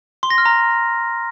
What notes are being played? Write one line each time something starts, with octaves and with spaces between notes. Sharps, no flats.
C6
A#6
F6
A#5